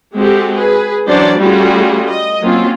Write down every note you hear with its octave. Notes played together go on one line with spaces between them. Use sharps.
G#3 C4 F#4 G4 A4
G#4 B4
E3 F#3 C#4 D4 C5 D5
G3 A3 C#4 F4 F#4 G#4
D#5
F#3 A#3 C4 C#4 F4